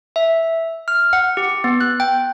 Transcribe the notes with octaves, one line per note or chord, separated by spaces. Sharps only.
E5
F6
F#5
G4
B3
F#6
G5